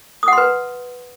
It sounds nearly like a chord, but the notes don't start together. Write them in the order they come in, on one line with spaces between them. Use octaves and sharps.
D#6 F#5 C6 B4